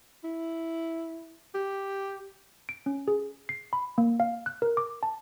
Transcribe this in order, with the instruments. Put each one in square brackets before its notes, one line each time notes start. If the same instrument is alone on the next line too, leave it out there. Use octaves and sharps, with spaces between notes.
[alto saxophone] E4
G4
[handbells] D7
C#4
G#4
C7
B5
A#3
F5
F#6
A#4
D6
A5